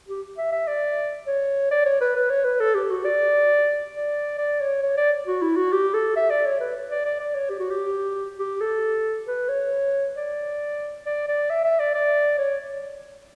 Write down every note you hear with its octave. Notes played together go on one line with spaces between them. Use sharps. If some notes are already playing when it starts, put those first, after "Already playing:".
G4
E5
E5
D5
C#5
D5
C#5
B4
B4
C#5
B4
A4
G4
F#4
D5
D5
D5
C#5
C#5
D5
F#4
E4
F#4
G4
A4
E5
D5
C#5
B4
D5
D5
D5
C#5
G4
F#4
G4
G4
A4
B4
C#5
D5
D5
D5
E5
E5
D5
D5
C#5